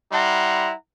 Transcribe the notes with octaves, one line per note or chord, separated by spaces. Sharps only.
G3 E4 F#5 A#5 C6